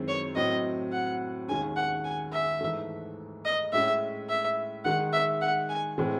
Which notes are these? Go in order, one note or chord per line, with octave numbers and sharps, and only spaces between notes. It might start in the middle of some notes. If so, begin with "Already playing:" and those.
Already playing: F#2 D#3 G#3 C4 E4
C#5
A2 F#3 C4 D#5
F#5
D#2 D#3 G#3 C#4 G#5
F#5
G#5
E5
G#2 E3 A3
D#5
A2 G#3 C#4 E5
E5
D#3 G#3 D#4 F#5
E5
F#5
G#5
A2 E3 G#3 C4